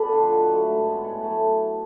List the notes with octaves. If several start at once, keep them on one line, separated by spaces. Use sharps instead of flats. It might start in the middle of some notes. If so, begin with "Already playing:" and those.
Already playing: B3 A4 B4 D5
D3 F3
B2
F#3 A3
G#2
G#3 B3
A2 A4 C#5
F#3 A3